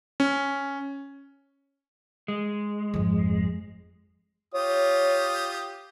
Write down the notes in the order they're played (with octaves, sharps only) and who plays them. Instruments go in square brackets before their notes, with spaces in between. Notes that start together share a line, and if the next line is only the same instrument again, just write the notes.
[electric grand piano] C#4
[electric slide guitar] G#3
[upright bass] G#1 F2
[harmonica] F4 G4 D#6 [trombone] C#5